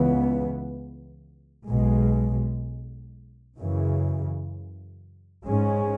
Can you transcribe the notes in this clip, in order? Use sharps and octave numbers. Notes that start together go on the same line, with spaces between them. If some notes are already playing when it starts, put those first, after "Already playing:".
Already playing: C#2 C#3 E3 B3
B1 B2 G#3
F#2 C#3 E3
G#2 G#3 C#4